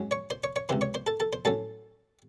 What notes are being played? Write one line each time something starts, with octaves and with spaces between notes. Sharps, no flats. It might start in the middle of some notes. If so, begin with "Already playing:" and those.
Already playing: G#2 F#3 C#4
C#5 C#6
C5 C6
C#5 C#6
C#5 C#6
C#2 C3 E3 C5 C6
C#5 C#6
C5 C6
A4 A5
A4 A5
C5 C6
A2 F#3 C#4 A4 A5